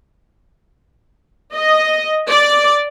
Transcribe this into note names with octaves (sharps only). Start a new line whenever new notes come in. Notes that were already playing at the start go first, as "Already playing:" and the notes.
D#5
D5